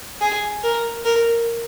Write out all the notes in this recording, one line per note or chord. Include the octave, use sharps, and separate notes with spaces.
G#4
A#4
A#4